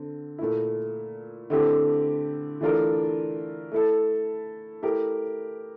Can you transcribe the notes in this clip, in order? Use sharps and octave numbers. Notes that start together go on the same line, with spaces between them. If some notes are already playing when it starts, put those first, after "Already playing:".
Already playing: D3 C4
A#2 A3 E4
D3 A3 C4 E4 G4
E3 A3 D4 F4 A#4
A3 E4 A4
A3 E4 G4 A#4